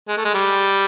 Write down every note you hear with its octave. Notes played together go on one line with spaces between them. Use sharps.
G#3
A3
G#3
G3